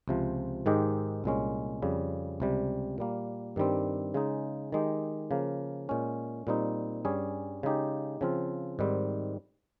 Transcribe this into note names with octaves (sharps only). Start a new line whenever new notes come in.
C#2 C3 F3
G#2 D#3 G#3 D#4 G4
C2 A#2 G#3 C#4
F2 C#3 G3
C#2 C3 G3
A#2 G3 A#3
G2 D#3 G3 C4
C#3 G#3 D#4
D#3 G#3 D#4 G4
C#3 F3 A#3
A#2 G#3 C#4
A#2 G3 C4 D#4
G2 G3 C#4 G#4
C#3 G#3 D#4 G4
C#3 F3 C4 F4
G#2 D#3 G3 C4